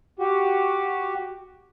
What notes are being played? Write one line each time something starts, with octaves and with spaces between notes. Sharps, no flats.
F#4 G4